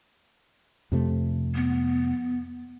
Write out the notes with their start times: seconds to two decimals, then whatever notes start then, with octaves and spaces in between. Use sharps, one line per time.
0.92 F2 C3 A3
1.55 B3